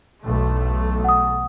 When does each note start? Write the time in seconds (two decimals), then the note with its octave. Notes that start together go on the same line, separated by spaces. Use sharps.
0.23 B1 E2 A3
1.04 F#5 D#6